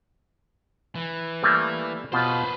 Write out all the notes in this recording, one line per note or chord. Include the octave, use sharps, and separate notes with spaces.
E3
G3 A3 A#3
B2 F4 G4 B4 C5